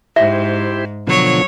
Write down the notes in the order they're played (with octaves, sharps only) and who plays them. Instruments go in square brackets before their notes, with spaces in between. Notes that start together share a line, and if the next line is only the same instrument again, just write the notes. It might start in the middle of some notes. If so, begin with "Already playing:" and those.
[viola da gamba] G#2 [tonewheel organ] E4 G4 C5 [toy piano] E5
[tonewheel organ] B2 D3 F3 [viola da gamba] F#3 C#5